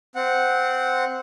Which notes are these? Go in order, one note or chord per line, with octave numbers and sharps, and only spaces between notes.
C4 F#5